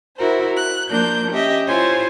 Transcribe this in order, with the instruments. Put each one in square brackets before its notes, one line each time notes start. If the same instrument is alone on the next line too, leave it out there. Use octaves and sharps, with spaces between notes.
[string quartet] E4 F#4 A#4 C5
F#6
F3 A#3 D4 A#4 G6
C#4 G4 D#5 E5
E4 F4 C5 C#5 G#5